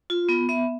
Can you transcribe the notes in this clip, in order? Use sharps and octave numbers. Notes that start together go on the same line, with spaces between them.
F4
B3
B3 E5